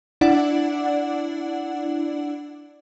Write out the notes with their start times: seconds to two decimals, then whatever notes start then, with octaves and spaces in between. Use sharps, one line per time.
0.21 D4 E4 D5 F#5